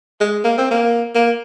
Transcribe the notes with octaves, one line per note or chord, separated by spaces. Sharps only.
G#3
A#3
C4
A#3
A#3